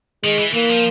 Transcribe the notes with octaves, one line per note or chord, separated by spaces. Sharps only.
D#3 G#3
E3
E3 A#3
F3